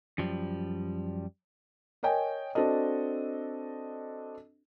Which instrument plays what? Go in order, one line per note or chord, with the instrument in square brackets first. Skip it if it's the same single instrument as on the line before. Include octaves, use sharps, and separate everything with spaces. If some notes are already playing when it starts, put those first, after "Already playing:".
[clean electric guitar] F#2 F3 G3
[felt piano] A#4 C#5 D#5 G5 G#5
C4 D4 F#4 A4 D#5